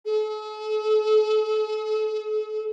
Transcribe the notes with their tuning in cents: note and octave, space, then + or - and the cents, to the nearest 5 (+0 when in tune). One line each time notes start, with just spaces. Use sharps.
A4 -45